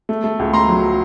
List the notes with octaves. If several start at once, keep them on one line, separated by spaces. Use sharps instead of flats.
A3
A3
C#2
A3 A#5 C6
F#3